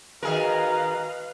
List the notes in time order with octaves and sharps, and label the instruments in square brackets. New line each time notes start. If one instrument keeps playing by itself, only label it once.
[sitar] D#3 G#4 A#4 [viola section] F#4 D#5 A#5 [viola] B4 F5